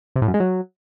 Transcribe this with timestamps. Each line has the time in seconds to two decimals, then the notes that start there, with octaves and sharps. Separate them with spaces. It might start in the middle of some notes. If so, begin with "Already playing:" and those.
0.16 C3
0.22 A2
0.28 F#2
0.34 G#3
0.40 F#3